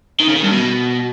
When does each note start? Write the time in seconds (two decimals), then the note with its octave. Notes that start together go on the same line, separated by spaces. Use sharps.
0.20 D#3
0.28 C#3
0.36 D#3
0.44 G2
0.52 B2